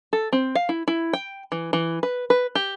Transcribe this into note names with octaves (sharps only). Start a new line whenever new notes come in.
A4
C4
F5
E4
E4
G5
E3
E3
B4
B4
G4